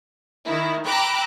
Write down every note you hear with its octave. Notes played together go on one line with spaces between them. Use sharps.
D#3 E4
G5 A#5 B5 D6 E6 F#6